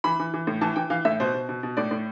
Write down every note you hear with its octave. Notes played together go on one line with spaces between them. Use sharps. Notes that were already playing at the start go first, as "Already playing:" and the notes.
E3 B5
E3
E3
A2
E3 A5
E3 G5
E3 F5
A2 E5
B2 C5
B2
B2
B2
A2 D5
A2